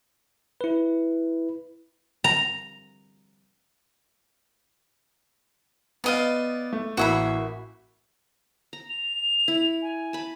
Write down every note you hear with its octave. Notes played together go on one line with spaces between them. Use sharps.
E4 B4
A#5
B3 D5 D#5 F5
A3
A1 E3 A#3 F#4 E5 B5
A#5
F7
E4
G#5
A5 B5